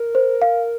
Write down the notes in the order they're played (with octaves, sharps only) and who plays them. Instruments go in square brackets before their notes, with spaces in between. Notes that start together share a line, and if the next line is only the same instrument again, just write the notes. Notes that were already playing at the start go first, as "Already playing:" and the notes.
Already playing: [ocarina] A#4
[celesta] C5
F5